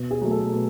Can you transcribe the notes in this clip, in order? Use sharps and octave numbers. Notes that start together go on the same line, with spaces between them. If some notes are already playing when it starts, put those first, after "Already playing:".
Already playing: B2
G#4
F#3 A3
A4
B2